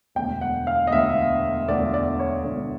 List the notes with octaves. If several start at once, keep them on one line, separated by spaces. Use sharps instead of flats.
E1 D2 D3 G5
F#5
F5
D#5
E1 D2 D3 E5
E1 D2 D3 D5
D5
C#5
E1 D2 D3 D5